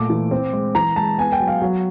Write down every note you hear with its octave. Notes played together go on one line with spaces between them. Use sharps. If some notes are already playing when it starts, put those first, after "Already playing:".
Already playing: A#2 A3 D6
E3
C4
G#3
E3 A#5
G#3 A5
B3 G#5
G5
F#3
F5
F#3